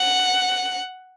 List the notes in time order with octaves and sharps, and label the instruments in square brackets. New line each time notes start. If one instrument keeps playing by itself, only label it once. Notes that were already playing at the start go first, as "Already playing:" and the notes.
Already playing: [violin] F#5